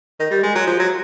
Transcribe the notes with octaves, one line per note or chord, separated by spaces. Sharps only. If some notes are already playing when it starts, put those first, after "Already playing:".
D#3
G3
G#3
F#3
F3
F#3